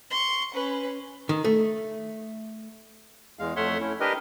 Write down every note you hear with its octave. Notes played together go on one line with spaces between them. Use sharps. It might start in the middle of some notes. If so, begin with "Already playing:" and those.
C6 C#6
C#4 B4
D#3
A3
E2 G#3 F5
F2 A3 C#5 E5 F#5 C6
A3 C#4 E4
D4 G4 A#4 B4 D#5